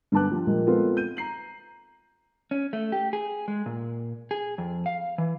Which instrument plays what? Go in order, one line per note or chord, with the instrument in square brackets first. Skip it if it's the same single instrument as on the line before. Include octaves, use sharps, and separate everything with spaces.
[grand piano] G2 D3 B3 A5 D6 F#6
F3 G3
A#2 F3 G3 G#3 A#3
G#3 B3 C4 F4 A4
G6 D#7
A#5 C7 F#7
[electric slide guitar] C#4
A3
G4
G#4
G#3
A#2
G#4
F2
F5
E3